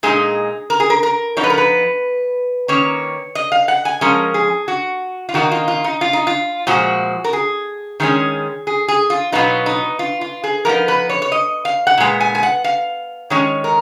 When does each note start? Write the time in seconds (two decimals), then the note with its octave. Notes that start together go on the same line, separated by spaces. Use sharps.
0.03 A#2 G#3 D#4 G#4
0.70 A#4
0.80 G#4
0.90 A#4
1.03 A#4
1.37 F3 B3 D#4 C#5
1.44 B4
1.50 A#4
1.58 B4
2.68 D#3 A#3 C#4 C#5
3.35 D#5
3.52 F5
3.68 F#5
3.85 G#5
4.01 F3 G#3 C#4 A#4
4.34 G#4
4.68 F#4
5.29 F4
5.34 D#3 A#3 D#4 F#4
5.52 F4
5.68 F4
5.84 D#4
6.01 F4
6.13 D#4
6.27 F4
6.67 A#2 F3 G#3 F#4
7.24 A#4
7.33 G#4
8.00 D#3 G#3 C#4 G#4
8.67 G#4
8.88 G#4
9.10 F4
9.32 B2 F#3 B3 D#4 F4
9.66 D#4
9.99 F4
10.21 F4
10.44 G#4
10.65 F3 B3 D#4 A#4
10.88 B4
11.10 C#5
11.22 C#5
11.32 D#5
11.65 F5
11.87 F#5
11.98 A#2 G#3 B3
12.20 G#5
12.35 G#5
12.43 F#5
12.64 F5
13.30 D#3 G#3 C#4 C#5
13.64 A#4